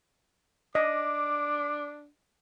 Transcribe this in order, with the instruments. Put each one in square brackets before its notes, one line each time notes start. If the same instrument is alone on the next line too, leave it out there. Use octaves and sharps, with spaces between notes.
[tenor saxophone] D4 [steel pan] D#5 [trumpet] D6